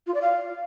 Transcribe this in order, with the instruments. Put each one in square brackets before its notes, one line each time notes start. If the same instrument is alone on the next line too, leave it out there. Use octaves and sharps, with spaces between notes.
[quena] F4
D5
F5